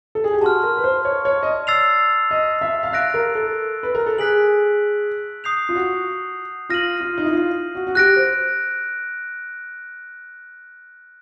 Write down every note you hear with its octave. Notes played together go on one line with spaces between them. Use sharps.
A4
G#4
G4
F#4 A5 C6 F6
A#4
B4
C5
C#5
C#5
D#5
D5
E6 A6 C7 F7
D#5
E5
F5
E5 F#6 A#6 D7
A#4
A4
B4
A#4
A4
G#4 F#6 B6 D7 F#7
D#6 G6 C7 F7
F4
F#4
F4 F6 A#6 D#7 F#7
F4
D#4
E4
F4
F#4
F#4
G4 F#6 A#6 D7
C5